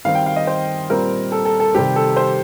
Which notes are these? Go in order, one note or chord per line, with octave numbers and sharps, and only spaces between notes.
D#3 G3 C4 F5
G5
F5
D#5
C5
A#2 G3 C4 A#4
A4
A4
A4
C3 D#3 G3 C4 G4
A4
C5